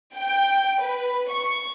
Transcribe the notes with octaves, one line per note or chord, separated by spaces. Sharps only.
G5
B4
C#6